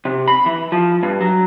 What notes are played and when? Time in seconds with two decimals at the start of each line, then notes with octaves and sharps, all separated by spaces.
0.05 C3
0.28 B5
0.46 E3
0.72 F3
1.03 G2
1.21 F#3